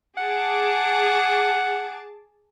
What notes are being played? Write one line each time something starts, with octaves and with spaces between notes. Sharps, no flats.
G#4 F#5 A5 D6